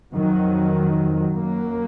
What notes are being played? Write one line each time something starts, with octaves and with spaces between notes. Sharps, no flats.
F2 D#3 F#3
F#2 F#3 A#3